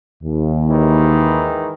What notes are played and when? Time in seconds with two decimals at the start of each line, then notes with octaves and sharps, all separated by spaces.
0.23 D#2
0.70 G#2 D#3 E3